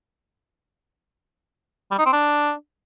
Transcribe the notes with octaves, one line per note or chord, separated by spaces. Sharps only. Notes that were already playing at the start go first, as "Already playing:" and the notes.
G3
D#4
C4
D4